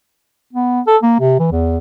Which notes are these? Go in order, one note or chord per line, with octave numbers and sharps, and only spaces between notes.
B3
A4
A#3
C3
E3
E2